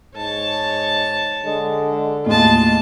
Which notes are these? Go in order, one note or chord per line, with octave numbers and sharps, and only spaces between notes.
G#2 C#5 A5
D3 G#3
D#2 A2 G#3 F4 A5